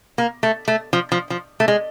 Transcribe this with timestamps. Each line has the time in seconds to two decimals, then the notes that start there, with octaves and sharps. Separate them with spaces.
0.18 A#3
0.43 A3
0.68 A3
0.93 F3
1.12 F3
1.30 F3
1.60 A3
1.68 G#3